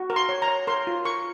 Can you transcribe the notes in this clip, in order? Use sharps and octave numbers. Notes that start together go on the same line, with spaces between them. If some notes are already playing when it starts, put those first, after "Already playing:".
Already playing: F#4
A#4
C6
C#5
A#5
C#5
A#4 C6
F4
A#4 C#6